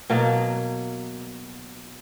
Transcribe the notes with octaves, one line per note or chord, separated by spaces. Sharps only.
B2 F#3 A#3